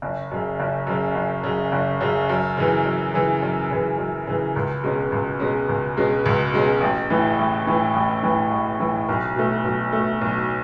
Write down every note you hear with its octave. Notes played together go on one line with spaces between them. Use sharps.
F#1
F#2 C#3
F#1
F#2 C#3
F#1
F#2 C#3
F#1
F#2 C#3
F#2
C#3 E3
F#2
C#3 E3
F#2
C#3 E3
F#2
C#3 E3
C#2
B2 G#3 C#4
C#2
B2 G#3 C#4
C#2
B2 G#3 C#4
C#2
B2 G#3 C#4
A1
A2 E3
A1
A2 E3
A1
A2 E3
A1
A2 E3
B1
B2 A3
B1
B2 A3
B1